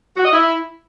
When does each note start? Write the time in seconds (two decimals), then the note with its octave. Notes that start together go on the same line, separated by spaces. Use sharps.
0.17 F#4
0.25 D#5
0.33 E4